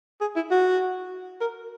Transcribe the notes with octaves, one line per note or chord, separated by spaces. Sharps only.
G#4
E4
F#4
A#4